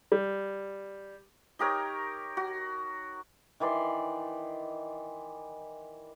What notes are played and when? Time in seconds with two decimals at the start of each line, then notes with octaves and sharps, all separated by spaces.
0.12 G3
1.59 D#4 G4 A#4 C#5
2.37 F#4
3.60 D#3 E3 D5 C6